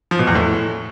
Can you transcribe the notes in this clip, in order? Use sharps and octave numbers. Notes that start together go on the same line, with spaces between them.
F3
B2
E2
A2